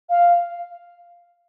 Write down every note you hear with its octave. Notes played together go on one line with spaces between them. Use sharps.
F5